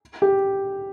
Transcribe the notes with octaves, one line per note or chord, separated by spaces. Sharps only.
G4